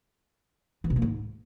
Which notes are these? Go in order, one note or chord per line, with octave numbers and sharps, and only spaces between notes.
E3
B2
A#3
G#2